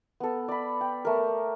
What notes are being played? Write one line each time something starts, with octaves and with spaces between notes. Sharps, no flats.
B3 A4
D5 B5
G5
A3 A#4